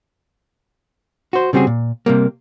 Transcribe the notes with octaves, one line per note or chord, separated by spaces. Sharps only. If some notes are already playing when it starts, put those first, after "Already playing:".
F#4 C5
C#3 G3 C4 F#4 G#4
A#2
C3 G3 A#3